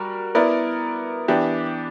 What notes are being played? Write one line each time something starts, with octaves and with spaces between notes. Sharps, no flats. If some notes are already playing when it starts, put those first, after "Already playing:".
Already playing: G3 F#4 A#4
B3 E4 A#4 D5
E3 B3 D4 G4